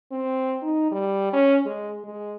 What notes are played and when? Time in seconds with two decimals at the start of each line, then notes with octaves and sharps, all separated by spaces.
0.12 C4
0.62 D#4
0.92 G3
1.33 C#4
1.66 G#3
2.05 G#3